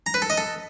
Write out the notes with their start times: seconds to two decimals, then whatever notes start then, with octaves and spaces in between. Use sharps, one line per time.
0.06 A#5
0.14 B4
0.22 A4
0.30 D#5
0.38 A4